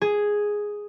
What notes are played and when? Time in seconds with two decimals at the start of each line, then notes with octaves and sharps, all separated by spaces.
0.01 G#4